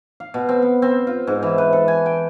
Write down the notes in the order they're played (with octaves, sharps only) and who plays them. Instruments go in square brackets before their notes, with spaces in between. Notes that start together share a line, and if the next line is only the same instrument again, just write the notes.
[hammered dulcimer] F5
B2
C4
B3
C4
F4
G#2
E3
B4
A4
G#5
G5